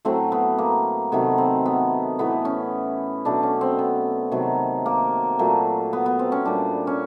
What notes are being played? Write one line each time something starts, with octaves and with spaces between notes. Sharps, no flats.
A2 F#3 A3 C4
B3
A#3
C3 D#3 F#3 A3 B3
C4
B3
A2 E3 A3 B3
C#4
B2 F#3 A3 D4
C#4
C4
B3
C3 D#3 F#3 A3
A#3
A#2 F#3 A3
B3
B3
C4
C#4
A#2 G3 D4
C#4